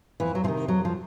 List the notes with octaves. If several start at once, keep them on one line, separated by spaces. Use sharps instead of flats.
F2 E3
F#3
C3 D#3 F3
F2 F#3
F3